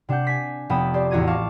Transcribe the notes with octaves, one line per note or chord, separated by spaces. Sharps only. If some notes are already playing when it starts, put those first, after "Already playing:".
C3 D4 G4 F#5 G6
G#5 B6 C7
F1 B3 G5 A5 B5 D#6
G4 C5 D5
A1 E2 F#4 A#5 G#6 D#7
F5 A5 C#6 D6